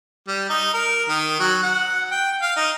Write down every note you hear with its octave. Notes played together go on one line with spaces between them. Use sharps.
G3
D#4
A#4
D#3
F#3
F#5
G5
F5
D#4